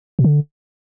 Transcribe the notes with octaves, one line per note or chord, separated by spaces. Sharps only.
B2
D3